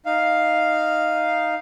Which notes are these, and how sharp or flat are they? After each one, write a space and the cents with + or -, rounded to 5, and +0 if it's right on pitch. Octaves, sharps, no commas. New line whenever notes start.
D#4 +0 F5 +0